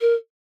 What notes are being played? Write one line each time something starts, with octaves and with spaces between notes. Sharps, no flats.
A#4